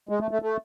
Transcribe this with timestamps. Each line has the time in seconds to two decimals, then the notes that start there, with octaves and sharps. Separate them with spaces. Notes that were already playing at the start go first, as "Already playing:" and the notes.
0.09 G#3
0.21 A3
0.31 A3
0.42 A3